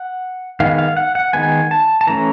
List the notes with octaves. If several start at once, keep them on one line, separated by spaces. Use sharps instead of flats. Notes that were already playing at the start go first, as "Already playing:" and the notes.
Already playing: F#5
D#3 G#3 B3 F5
F5
F#5
F#5
D#3 G#3 B3 G#5
A5
A5
E3 A3 C#4 A#5